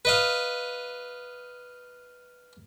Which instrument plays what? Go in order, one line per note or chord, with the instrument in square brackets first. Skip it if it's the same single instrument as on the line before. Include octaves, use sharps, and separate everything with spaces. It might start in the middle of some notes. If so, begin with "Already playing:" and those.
[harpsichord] B4 D#5 F5